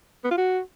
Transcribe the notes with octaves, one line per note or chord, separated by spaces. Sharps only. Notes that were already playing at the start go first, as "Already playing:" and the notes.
B3
F4
F#4